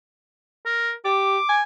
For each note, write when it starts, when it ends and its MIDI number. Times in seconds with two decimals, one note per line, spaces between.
0.66 0.91 70
1.05 1.38 67
1.05 1.56 86
1.49 1.63 80